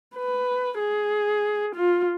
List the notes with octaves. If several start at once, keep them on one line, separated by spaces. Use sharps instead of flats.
B4
G#4
F4